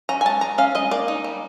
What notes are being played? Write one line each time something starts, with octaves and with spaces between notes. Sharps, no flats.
C#4 A#5
G#5
G#3 A5
G#3 A#5
C#4 F5
G#3 D#5
A#3 D5
D#4
G3